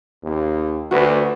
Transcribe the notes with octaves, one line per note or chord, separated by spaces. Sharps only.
D#2
D2 F#4 B4